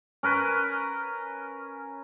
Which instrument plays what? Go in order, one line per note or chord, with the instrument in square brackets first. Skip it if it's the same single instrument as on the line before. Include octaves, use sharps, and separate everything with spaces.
[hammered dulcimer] C#4 A#4 B4